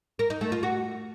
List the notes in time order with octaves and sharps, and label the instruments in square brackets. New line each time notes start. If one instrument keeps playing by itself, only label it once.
[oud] A#4
D#4
A3
F4
F#4